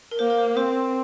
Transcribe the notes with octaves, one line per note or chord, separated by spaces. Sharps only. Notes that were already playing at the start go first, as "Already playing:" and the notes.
A#4
A#3 C5
A#4
C5
C4 C5